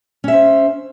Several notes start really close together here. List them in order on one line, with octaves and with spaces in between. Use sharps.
C#4 E5 C5